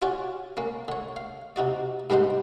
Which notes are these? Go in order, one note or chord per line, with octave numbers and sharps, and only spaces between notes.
C#4 F4 F#4 C#5 D5
A#3 C#4
D3 C#5
F5
C3 D#4 F#4 D5
G#2 G3 B3 D4 D#4 C5